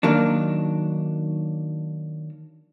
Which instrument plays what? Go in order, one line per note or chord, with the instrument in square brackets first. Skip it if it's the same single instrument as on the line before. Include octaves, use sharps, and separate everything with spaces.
[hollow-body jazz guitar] D#3 F#3 A#3 D4